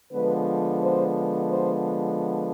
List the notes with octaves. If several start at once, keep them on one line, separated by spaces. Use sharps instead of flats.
D3 F3 G#3 B3 B4
C5
C5